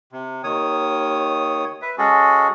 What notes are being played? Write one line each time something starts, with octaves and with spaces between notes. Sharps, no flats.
C3
D#2 D#3 C#5 D#6
B4 E5
G#3 C#4 F#4 G#4 A4